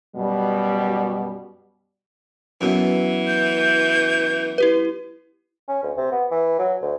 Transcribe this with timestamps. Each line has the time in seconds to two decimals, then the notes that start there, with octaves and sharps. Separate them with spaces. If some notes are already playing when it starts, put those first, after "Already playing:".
0.16 F#2 B2 G3
2.61 F#2 B2 E3
3.27 G6
4.58 E4 G4 B4
5.69 C#4
5.83 D2
5.97 C3
6.12 B3
6.31 E3
6.59 F#3
6.81 D2